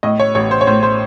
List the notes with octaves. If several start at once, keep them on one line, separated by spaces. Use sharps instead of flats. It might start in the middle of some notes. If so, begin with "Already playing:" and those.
A2 D#5
C#5
A1 C#5
C5
C#5
A2 C5
C5